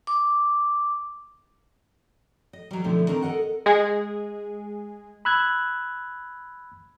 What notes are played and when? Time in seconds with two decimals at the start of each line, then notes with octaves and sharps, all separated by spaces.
0.07 D6
2.53 D#5
2.71 F#3 G3
2.84 B2 D3 D#3 F3 A3 E4
3.08 D#3 C4 D4 A#4
3.22 A4 A#4 D#5 F#5
3.66 G#3 G#4
5.25 B5 E6 F#6 G#6